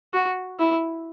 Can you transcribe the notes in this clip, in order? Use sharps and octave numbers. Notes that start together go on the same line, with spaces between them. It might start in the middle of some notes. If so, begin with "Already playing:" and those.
F#4
E4